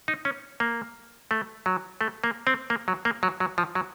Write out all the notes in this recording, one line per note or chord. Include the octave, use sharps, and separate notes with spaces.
D#4
C#4
A#3
A3
F#3
A3
A#3
C4
A#3
F#3
A#3
F#3
F#3
F3
F#3